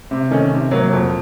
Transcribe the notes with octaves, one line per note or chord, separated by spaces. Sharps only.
C3
D#3 A3 C#4
C3
F#3 A#3
F2